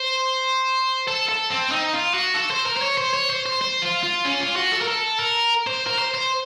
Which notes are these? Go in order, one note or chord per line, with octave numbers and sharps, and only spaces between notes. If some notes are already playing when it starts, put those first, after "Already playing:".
Already playing: C5
A4
A4
C4
D#4
F4
F#4
A4
C5
A#4
C5
C#5
C5
C#5
C5
C5
C5
F4
F4
C#4
F4
F#4
A4
A#4
A4
A#4
C5
A#4
C5
C5